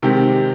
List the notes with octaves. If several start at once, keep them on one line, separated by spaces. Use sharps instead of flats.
C3 D#3 G#3 C4 G4